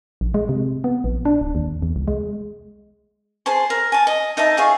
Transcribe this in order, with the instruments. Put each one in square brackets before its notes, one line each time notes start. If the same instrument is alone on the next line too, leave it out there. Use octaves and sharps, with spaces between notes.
[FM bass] A#1
G#3
C3
B3
A#1
D4
D1
D#2
E2
C2
G#3
[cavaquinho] G#4 C5 A5 C6
A#4
G#5 A5
D#5
D#4 D#5 E5 A5
F4 G#4 C#5